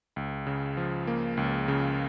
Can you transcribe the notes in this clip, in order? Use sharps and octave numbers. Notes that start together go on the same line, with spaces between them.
C#2
C#3
F3
A#3
C#2
C#3